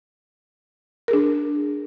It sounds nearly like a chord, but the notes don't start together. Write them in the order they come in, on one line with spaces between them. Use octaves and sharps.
A#4 G#4 D4